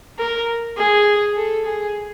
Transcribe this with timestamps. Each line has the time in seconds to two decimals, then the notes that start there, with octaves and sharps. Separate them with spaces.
0.19 A#4
0.77 G#4
1.36 A4
1.65 G#4